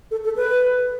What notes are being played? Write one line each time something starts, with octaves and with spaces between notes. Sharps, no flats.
A4
A4
B4